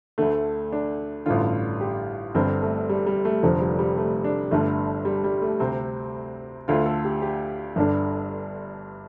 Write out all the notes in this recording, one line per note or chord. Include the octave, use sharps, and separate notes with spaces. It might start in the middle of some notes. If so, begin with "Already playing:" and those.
D2 D3 A3
D4
A1 G2 D3 F4
G4
G1 G2 D3 C4
A3
G3
G3
A3
F1 F2 D3 F3
G3
G3
A3
D4
G1 G2 D3 A3
G3
G3
A3
D2 C3 C4
D2 D3 F4
A4
G4
G4
G1 G2 D3 D4